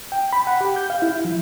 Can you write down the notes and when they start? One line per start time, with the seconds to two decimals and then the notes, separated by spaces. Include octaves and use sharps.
0.12 G5
0.33 B5
0.47 F#5
0.61 G4
0.76 G6
0.90 F5
1.02 E4
1.25 F3